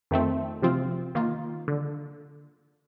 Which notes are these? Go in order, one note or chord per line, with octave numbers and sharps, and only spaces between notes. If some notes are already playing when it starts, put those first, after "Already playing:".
F2 D#3 A3 C4
C3 F3 C4 F4
D#3 A#3 F4
D3